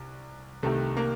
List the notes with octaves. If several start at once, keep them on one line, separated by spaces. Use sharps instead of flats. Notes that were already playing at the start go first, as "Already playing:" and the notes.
Already playing: C2
C2 C3 D#3 A3
A#3